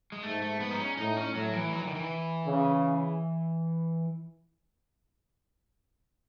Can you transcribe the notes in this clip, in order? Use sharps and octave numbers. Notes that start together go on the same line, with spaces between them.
G#3
G#2 A3
A3
B3
D#4
C#4
A2 D#4
C#4
A2 F#3
E3
F#3
E3
D#3
E3
C#3